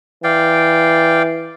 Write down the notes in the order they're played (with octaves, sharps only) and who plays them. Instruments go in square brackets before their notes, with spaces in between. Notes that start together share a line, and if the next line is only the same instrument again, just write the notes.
[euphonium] E3 [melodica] D5 F5 G5